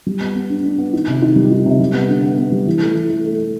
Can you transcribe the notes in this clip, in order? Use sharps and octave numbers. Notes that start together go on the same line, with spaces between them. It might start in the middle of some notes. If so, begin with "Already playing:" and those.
G3
B3
B3
D4
D4
B3
D#3
C3
D#3
G3
D#3
C3
G3
B3
D3
B3
B3
G3
E3
A3
E3
A3
A3
A3